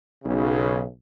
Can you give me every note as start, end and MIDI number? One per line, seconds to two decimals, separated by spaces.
0.23 0.84 35
0.23 0.84 49